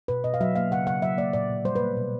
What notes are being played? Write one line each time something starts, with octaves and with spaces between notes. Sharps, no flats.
B2 B4
B2 D#5
F5
F#3 E5
A#3 F5
C#3 F#5
C#3 F#5
F#3 E5
A#3 D5
A#2 D5
A#2
G3 C5
B4
A#3
B2